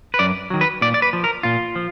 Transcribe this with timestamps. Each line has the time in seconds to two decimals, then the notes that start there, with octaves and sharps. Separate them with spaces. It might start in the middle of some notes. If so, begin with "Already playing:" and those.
0.14 B4
0.19 F#2 D5
0.50 D#3 F#3
0.61 B4
0.81 A#2 D5
0.94 D5
1.02 B4
1.13 F3
1.24 A#4
1.43 A#2 F4
1.76 F3